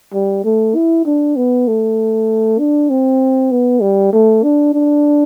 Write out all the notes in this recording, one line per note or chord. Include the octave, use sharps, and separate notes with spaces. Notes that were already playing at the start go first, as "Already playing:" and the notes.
G3
A3
E4
D4
B3
A3
D4
C4
B3
G3
A3
D4
D4